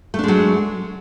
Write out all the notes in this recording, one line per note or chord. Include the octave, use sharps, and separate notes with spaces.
F#3 G#3 A3 D4